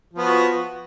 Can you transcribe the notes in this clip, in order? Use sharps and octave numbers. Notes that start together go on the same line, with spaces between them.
F3 B3 F#4